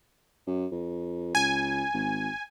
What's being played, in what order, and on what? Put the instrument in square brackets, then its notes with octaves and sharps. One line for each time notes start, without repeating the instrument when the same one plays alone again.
[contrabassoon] F#2
F2
[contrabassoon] C#2 [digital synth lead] G#5
[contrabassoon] G#1